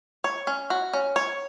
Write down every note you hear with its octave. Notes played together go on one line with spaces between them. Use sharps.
C#5
C#4
F#4
C#4
C#5